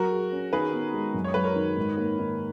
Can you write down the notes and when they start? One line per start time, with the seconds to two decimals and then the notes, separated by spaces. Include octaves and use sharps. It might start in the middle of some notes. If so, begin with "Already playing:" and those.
Already playing: F#3 F#4 A#4
0.11 G#4
0.32 C#4
0.53 D#3 G#4 B4
0.73 B3
0.93 G#3
1.14 F#2
1.24 C#5
1.34 F#3 B4
1.44 A#4 C#5
1.56 D#3
1.77 G#2
1.97 A#3
2.19 D#3